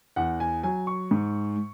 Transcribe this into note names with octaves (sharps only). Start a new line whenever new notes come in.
E2 F#5
G#5
F#3 G#5
C#6
G#2